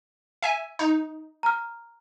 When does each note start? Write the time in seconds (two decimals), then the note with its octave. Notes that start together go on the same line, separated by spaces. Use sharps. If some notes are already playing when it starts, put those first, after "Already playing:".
0.43 E5 G#5
0.79 D#4
1.43 A#5 F6